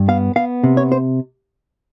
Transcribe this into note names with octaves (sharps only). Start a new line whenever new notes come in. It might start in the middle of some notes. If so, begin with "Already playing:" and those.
Already playing: G2
B3 F5
B3 F5
C3
C#5
C5